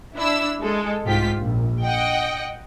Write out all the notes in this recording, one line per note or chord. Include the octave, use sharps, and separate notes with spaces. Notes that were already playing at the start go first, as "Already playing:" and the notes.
D4 E4 E6
G#3 A4
C2 G#2 F4 G4 B6
A#1
D#5 F#5 G5